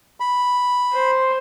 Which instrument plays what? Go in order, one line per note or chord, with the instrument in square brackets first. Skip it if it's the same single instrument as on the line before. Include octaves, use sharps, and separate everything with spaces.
[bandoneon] B5
[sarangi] C5